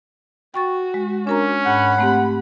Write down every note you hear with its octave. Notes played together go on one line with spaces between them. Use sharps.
F#4 G5 C#6 A6
G#3
C#4 D4 A#4 A#5
G#2 F#5 B5
A3 C4 G4